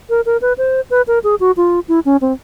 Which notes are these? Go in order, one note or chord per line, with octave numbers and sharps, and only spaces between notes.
A#4
A#4
B4
C5
B4
A#4
G#4
F#4
F4
E4
C#4
C4